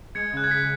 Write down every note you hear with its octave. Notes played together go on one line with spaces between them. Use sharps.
G#3 G#6 C#7
C#3 F#6
G#6
B6